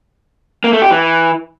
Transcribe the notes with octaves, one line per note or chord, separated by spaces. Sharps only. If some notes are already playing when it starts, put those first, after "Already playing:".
A#3
A3
G4
E3